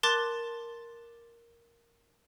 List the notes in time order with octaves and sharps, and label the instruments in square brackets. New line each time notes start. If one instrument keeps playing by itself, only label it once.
[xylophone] A#4 A5 C6 D6 F#6 A6